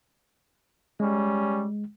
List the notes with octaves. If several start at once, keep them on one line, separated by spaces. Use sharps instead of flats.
G3 G#3 C#4